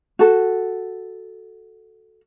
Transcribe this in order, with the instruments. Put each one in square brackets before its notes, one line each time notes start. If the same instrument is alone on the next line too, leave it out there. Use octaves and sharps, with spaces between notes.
[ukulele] F#4 A4